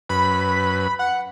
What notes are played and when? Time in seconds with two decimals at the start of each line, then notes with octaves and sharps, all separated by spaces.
0.09 F#2 B4 B5
0.99 F#5